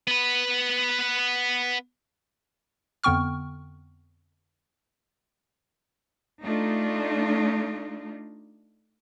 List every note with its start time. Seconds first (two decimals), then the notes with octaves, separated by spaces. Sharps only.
0.07 B3 B4
3.04 F2 D3 B3 G5 C#6 F6
6.43 A3 D4 D#4 F4